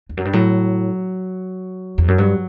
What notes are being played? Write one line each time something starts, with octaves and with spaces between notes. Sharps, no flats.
E2
F#2
G2
A2 F#3
E2
F#2
G2 F#3